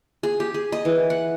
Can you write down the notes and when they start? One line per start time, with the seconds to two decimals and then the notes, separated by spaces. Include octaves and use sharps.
0.23 G#4
0.40 G4
0.54 G#4
0.72 D#5
0.85 E3
1.10 F#5